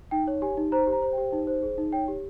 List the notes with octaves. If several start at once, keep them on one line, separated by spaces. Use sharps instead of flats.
D#4 G5
C#5
G4 G#5
D#4
C5 A#5
G4
A#5
C5
G4 G5
D#4
C5
G#4
D#4
C#5 G5
G4